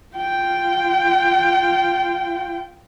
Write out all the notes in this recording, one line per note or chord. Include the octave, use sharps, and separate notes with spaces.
F4 G5